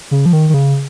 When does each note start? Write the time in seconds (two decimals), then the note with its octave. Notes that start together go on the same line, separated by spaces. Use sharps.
0.11 C#3
0.26 F3
0.33 D#3
0.49 D#3
0.54 C#3